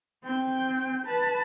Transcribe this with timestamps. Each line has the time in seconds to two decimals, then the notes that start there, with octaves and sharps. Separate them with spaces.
0.24 C4 G5
1.06 B4 A5